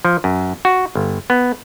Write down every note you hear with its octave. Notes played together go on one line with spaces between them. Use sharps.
F3
F#2
F#4
G1
B3